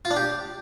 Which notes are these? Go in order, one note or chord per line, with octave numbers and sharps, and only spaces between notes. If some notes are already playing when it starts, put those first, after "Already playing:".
F4
D4
G4